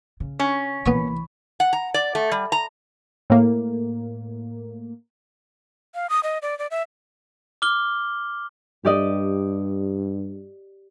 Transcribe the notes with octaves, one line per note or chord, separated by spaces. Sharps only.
C#3
C#4
C2 E3 A#3 B3 A#5 B5 C#6
F#5
A#5
D5
A3
G3
A#5
A2 A#3
F5
D#6
D#5
D5
D5
E5
D6 F6 G7
G2 G4 D5 D#5